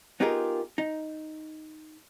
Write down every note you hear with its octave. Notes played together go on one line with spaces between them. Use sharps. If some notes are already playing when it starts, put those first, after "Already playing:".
B3 D#4 F4 G4 G#4 A#4
D#4